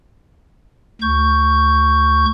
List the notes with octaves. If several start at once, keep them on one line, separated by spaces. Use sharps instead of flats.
D2 C#6 G6